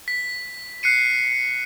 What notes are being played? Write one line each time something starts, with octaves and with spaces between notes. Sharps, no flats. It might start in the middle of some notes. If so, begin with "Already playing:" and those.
B6
F#6 C7 C#7 D#7